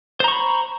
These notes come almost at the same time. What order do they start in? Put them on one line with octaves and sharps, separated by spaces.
C5 A#5 C#6 B5